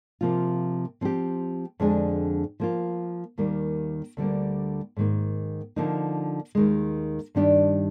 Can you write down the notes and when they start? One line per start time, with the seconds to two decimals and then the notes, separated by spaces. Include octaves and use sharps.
0.21 C3 F3 A#3 F4
1.01 F3 C4 G4
1.80 F2 D3 G#3 D4 G#4
2.60 F3 A#3 F4
3.38 D#2 D#3 G3 A#3
4.17 D2 D3 G3 A#3
4.97 G#2 D#3 A#3
5.76 D3 F3 A#3 D#4
6.55 D#2 D#3 G#3
7.35 G2 D#3 G3 D4 G4